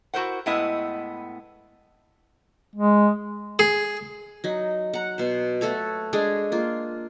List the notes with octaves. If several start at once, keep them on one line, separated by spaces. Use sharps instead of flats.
E4 F#4 G4 A#4 C5 F#5
A2 G#3 B3 E4 D#5
G#3
G#4
F#3 D#4
F#5 A#5
B2 C5
A3 F#4 A4 C#5
G#3 D4 G#4 A4
A#3 F4